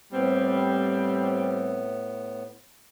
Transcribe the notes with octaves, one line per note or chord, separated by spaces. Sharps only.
A2 G3 B3 C4